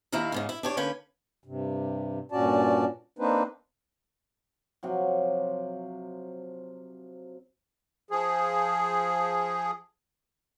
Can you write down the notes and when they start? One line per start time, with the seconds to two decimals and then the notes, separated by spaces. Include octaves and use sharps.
0.12 D#2 A#2 D#3 E4 F5 A#5
0.32 E2 G#2 C#3
0.49 E4
0.63 D4 G4 C#5
0.77 D3 A#3 C#4 B4 G5
1.44 G2 C3
2.32 G2 A#2 C#4 F#4 D5 A5
3.19 A#3 C4 D4 D#4 B4 C5
4.83 C3 F3 F#3
8.11 F3 G#4